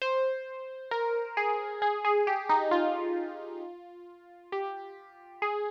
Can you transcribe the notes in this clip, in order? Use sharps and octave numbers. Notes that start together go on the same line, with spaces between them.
C5
A#4
G#4
G#4
G#4
G4
D#4
F4
G4
G#4